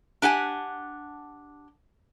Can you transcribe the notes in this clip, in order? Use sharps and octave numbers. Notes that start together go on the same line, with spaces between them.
D4 G4 F#5 G#5